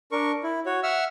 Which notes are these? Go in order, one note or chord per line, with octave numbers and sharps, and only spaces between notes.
D4 A#4 C#6
E4
F#4 C#5
E5 F#5 E6 F6